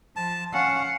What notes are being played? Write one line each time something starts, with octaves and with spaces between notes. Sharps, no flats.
F3 A5
C#4 F5 F#5